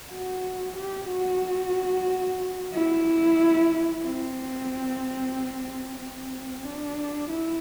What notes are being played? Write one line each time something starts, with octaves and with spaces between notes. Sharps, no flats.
F#4
G4
F#4
E4
C4
C4
D4
E4